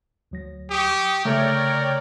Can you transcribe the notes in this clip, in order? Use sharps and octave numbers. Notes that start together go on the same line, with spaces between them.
D2 F#3 A#6
G4 C#6 D#6
C#3 A3 A#4 C#5 D5 G5